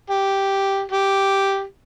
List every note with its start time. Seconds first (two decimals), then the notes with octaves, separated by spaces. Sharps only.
0.10 G4
0.91 G4